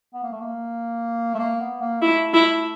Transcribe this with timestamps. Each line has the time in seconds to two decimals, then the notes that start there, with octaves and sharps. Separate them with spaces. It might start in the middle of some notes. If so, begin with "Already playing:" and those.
0.14 B3
0.23 A#3
0.32 A3
0.41 A#3
1.34 A3
1.39 A#3
1.61 B3
1.81 A#3
2.01 A3 E4
2.34 E4